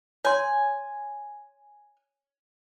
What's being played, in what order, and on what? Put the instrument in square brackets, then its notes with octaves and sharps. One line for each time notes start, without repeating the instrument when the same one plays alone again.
[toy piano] C#5 C6 [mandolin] G#5